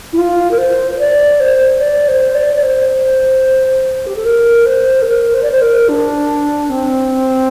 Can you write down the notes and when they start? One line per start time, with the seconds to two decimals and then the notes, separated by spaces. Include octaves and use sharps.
0.13 E4
0.18 F4
0.51 A#4
0.58 C5
0.91 C5
0.99 D5
1.40 C5
1.81 D5
2.08 C5
2.35 D5
2.56 D5
2.62 C5
4.06 G4
4.16 A4
4.25 A#4
4.66 C5
5.02 A4
5.07 A#4
5.34 C5
5.43 D5
5.51 C5
5.61 A#4
5.89 D4
6.70 C4